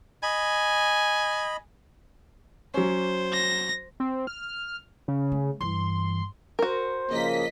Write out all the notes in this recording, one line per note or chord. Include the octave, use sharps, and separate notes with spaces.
D#5 G#5 B5
F#3 C#4 C5
A#6
C4
F6
C#3
A3
G2 E3 C6
F#4 A#4 C5
C#3 F3 A#3 D#5 B6